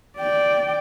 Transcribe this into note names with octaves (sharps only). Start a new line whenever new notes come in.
D5 G5